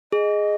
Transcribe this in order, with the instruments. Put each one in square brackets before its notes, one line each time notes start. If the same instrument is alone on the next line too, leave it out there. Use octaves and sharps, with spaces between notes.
[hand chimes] G#4 [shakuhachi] D#5